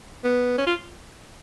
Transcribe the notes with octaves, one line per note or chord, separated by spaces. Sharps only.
B3
C#4
F4